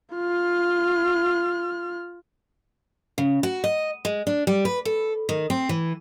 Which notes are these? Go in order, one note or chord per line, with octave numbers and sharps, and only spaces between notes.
F4 F6
C#3
F#4
D#5
G#3
D4
G3
B4
A4
D#3
C4
E3